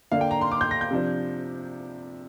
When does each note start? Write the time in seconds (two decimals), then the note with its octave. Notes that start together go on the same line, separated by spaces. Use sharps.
0.12 D3 A#3 D4 F5
0.21 G5
0.31 A#5
0.41 C6
0.52 D6
0.61 G6
0.71 A#6
0.81 G6
0.91 C3 F3 D4